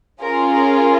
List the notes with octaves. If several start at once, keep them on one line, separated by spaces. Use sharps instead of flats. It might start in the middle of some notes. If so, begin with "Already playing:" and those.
C#4 F4 G#4 A#4
A#4